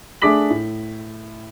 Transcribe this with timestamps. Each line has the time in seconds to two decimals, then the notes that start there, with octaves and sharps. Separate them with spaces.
0.22 A3 D4 G#4 D6 B6 F#7
0.50 A2